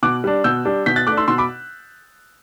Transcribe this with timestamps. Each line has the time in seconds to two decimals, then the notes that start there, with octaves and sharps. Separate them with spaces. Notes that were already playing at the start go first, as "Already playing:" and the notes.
0.03 B2 D6 F#6
0.24 G3 D4
0.44 B2 E6 G6
0.65 G3 D4
0.86 B2 G6 B6
0.96 F#6 A6
1.07 A3 D6 F#6
1.11 D4
1.17 C6 E6
1.28 B2 C6 E6
1.38 B5 D6